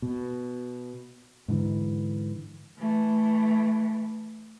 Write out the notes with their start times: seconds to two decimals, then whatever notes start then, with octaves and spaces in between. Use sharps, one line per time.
0.02 B2
1.48 G#2 D3 E3
2.79 E3 A3